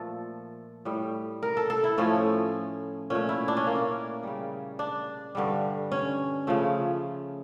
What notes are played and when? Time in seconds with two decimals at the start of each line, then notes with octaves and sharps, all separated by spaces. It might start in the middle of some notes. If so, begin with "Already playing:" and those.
Already playing: A#2 F3 A3 A4
0.85 A2 G3
1.43 A#4
1.57 A4
1.70 A4
1.84 E4
1.98 A2 F3 A3 C#4
3.10 A#2 A3 C#4
3.29 E4
3.48 D4
3.57 C#4
3.67 A#3
3.75 C#4
4.23 C#3 G3
4.79 D4
5.35 G2 D3 G3
5.92 C#4
6.47 C#3 F3 A3